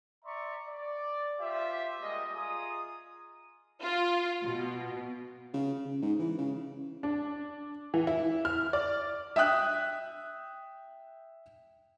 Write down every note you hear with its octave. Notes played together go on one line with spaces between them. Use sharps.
D5 E5 A#5 C6 C#6
D5
F4 G4 C5 E5
G3 G#3 A#3 D#5
F4 G#4 A#5 D#6
F4
B2
C#3
C#3
G#2
E3
C#3
D4
E3
E4
F6
D5
E5 G5 D#6 F#6